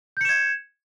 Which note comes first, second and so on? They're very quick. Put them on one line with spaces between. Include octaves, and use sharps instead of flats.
G6 C#7 E7 G#6